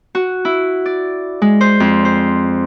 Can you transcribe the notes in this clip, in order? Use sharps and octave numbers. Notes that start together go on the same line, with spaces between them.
F#4
E4
D5
G#3
C5
F2
C5